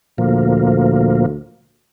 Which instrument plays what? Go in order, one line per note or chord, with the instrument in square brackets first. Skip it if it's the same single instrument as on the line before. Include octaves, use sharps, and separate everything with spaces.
[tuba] D2 [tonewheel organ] A#2 F3 A#3